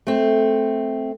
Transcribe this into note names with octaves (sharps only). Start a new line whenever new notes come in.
A3 C4